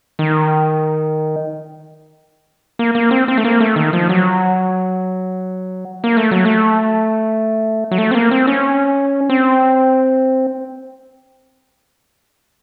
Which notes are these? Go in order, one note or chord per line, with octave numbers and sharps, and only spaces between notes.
D#3
A#3
A#3
C4
C4
A3
A#3
A3
D#3
F3
F#3
A#3
A3
F#3
A3
F#3
A3
C4
A#3
C4
C#4
C4